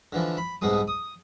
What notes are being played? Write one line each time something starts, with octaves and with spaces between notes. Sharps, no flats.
D3 E3 F3
B5
C2 G#2 B2 G#3 D#6
D#6